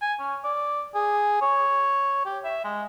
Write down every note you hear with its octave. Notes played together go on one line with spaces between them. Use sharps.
G#5
C#4
D5
G#4
C#5
G4
E5
G#3